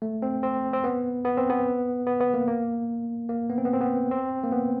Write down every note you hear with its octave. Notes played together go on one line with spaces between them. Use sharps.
A3
C4
C4
C4
B3
B3
C4
B3
B3
B3
A#3
A#3
A#3
B3
C4
B3
C4
B3
C4
A#3
B3